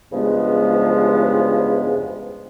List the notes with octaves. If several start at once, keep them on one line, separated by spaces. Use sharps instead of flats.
E2 G2 C#3 F3 G#3 B3